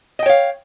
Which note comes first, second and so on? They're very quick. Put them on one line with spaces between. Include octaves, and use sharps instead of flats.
D#5 G5 C#5 F5